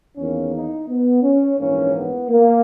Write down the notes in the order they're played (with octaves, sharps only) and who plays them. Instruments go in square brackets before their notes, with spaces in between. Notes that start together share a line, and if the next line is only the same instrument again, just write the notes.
[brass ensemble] E2 D#3 A#3 C#4
D#4
B3
C#4
A#1 G#2 E3 A#3 C#4
B3
A#3